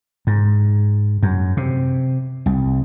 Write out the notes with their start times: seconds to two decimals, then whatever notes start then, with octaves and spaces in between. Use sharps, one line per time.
0.27 G#2
1.23 F#2
1.57 C3
2.46 C2